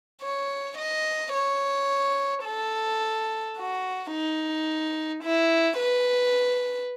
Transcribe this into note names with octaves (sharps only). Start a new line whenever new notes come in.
C#5
D#5
C#5
A4
F#4
D#4
E4
B4